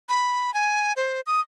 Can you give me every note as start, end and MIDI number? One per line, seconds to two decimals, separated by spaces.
0.09 0.53 83
0.54 0.93 80
0.96 1.21 72
1.27 1.41 87